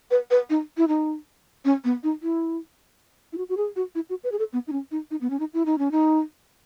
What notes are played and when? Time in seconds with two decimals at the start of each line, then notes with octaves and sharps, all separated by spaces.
0.11 B4
0.31 B4
0.50 D#4
0.77 E4
0.88 D#4
1.65 C#4
1.84 B3
2.03 D#4
2.23 E4
3.33 E4
3.38 F#4
3.49 F#4
3.57 G#4
3.76 F#4
3.95 E4
4.10 F#4
4.24 B4
4.32 G#4
4.39 A4
4.53 B3
4.67 D#4
4.72 C#4
4.91 D#4
5.11 D#4
5.21 B3
5.30 C#4
5.40 D#4
5.54 E4
5.66 D#4
5.78 C#4
5.91 D#4